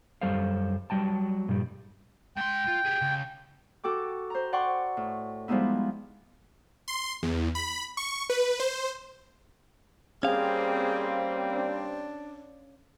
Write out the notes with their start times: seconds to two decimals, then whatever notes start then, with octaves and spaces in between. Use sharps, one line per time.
0.21 F#2 G3 A4 C5 F5
0.90 F#3 G3 G5 A5
1.48 G2 A#2 G3
2.37 G#2 G5 C6
2.67 F4
2.85 G4 G#4
3.01 C#2
3.84 F#4 A4 G5 D6
4.30 C5 A#5
4.53 D5 F#5 G5 C6 C#6
4.97 A2
5.48 F3 G3 G#3 B3 D#4 E4
6.88 C6
7.23 E2
7.55 B5
7.97 C#6
8.30 B4
8.60 C5
10.23 G3 A#3 C4 C#4 G#4 F5
11.53 D4